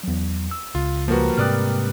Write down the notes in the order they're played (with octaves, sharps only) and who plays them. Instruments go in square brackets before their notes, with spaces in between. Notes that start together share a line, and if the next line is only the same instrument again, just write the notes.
[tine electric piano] E2 F#3
E6
[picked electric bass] C#2 [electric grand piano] F4
[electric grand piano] F3 G3 F#4 [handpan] A#3 A#4 B4
[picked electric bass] G#2 C3 [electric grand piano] G3 D5 F#6 [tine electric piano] G5 D#6 F6